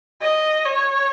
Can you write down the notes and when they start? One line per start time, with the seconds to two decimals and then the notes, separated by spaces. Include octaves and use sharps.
0.22 D#5
0.65 C#5